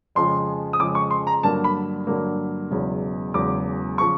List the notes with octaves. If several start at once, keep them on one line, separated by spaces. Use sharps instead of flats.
F2 C#3 F3 G#3 C6
D#6
F2 C#3 F3 G#3 D6
C#6
C6
A#5
G2 D3 F#3 A#3 A5
B5
G2 D3 F#3 A#3
E1 E2 C#3 F#3
E1 E2 C#3 F#3 D6
C#3 F3 C#6